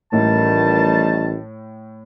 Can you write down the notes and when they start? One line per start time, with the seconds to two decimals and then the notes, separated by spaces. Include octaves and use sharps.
0.13 A1 A2 D#3 G3 A5